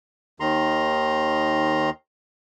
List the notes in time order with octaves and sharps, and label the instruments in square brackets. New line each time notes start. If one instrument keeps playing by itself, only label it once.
[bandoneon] D#2 D#3 A#5 C6